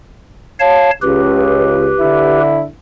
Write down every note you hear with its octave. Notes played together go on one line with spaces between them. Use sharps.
C#5 F5 A5
C#2 G4 B4
D3 D4 E4